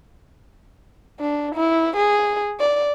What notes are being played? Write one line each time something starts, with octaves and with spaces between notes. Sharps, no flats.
D4
E4
G#4
D5